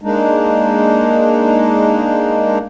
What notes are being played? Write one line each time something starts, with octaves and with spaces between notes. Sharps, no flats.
G#3 A#3 D4 D#4